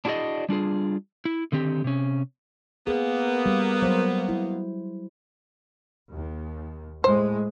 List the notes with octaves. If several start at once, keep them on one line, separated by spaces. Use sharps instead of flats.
D4 E4 F#4 G#4 D5 D#5
G3 D4 F4 G#4
E4
D3 D#3 C4 G4
C3 C#4
A#3 B3 G#4
G3
F#3 C5
E4
D#2
A2 G#3 C5